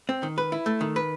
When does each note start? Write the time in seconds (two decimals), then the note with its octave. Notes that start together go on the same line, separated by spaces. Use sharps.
0.09 C4
0.23 D#3
0.38 B4
0.52 E4
0.66 A3
0.81 D#3
0.96 B4